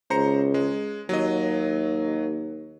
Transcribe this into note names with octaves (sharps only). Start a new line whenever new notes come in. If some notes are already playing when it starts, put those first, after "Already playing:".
C#2 C5 A#5 C#7
G#3
D#2 F#3 D#5